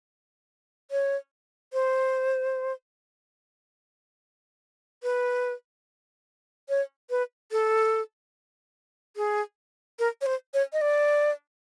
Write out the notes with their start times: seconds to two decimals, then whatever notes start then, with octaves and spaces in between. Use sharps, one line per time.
0.91 C#5
1.73 C5
5.03 B4
6.69 C#5
7.10 B4
7.52 A4
9.16 G#4
9.99 A#4
10.21 C#5
10.26 C5
10.54 C#5
10.73 D#5
10.81 D5